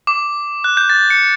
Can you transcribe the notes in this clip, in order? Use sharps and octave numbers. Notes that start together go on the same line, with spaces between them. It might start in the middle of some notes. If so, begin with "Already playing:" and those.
D6
F#6
G6
A6
C#7